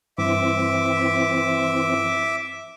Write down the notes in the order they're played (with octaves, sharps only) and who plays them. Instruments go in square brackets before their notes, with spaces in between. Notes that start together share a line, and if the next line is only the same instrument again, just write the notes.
[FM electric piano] G2 [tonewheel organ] E3 C4 [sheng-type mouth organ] E5 D6